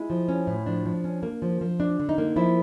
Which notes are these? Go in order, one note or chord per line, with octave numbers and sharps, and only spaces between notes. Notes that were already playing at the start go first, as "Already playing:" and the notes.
Already playing: G#3 E4
F3
C#4
A2
F3 D4
F3
C#4
A#3
F3
F3
D4
D3
D#4
A#3
F3 E4